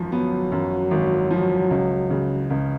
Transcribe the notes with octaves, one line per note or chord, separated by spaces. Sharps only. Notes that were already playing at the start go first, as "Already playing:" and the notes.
Already playing: G#1 F#2 F3
F#3 B3
F#2
G#1
F3
C#2
C#3
C#2